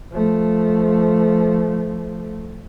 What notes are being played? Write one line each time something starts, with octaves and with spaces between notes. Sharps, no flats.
F3 A3